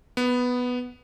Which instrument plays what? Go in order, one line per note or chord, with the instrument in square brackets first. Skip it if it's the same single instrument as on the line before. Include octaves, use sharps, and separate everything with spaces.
[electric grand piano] B3